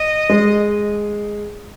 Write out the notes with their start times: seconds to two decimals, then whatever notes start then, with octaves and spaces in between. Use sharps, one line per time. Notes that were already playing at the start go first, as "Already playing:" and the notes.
Already playing: D#5
0.29 G#3